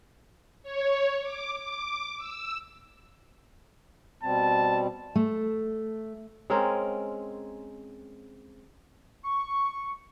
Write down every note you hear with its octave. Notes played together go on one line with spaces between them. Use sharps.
C#5
D6
D6
E6
B2 G3 C4 A5
A3
G#3 C4 C#4 A#4
C#6